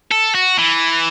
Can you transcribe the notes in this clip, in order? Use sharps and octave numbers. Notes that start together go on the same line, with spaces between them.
A4
F#4
E3